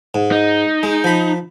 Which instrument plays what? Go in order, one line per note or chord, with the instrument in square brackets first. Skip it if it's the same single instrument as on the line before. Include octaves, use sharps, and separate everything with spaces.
[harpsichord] G#2
[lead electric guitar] D#4
[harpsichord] G#3
F3 B5